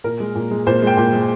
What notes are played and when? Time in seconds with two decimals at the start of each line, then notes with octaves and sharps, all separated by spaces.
0.04 A#2 A#4
0.20 G#3
0.35 A#2
0.51 G#3
0.67 A#2 C5
0.82 G#3
0.87 G5
0.97 A#2 G5
1.13 G#3